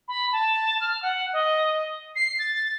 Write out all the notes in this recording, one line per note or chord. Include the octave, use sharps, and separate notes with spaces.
B5
A5
F6
F#5
D#5
C7
A6